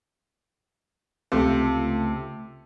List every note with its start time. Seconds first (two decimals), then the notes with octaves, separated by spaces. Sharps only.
1.32 C#2 C3 A3 F4 A4